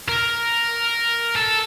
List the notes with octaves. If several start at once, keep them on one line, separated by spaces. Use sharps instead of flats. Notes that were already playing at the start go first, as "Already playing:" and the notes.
A#4
A4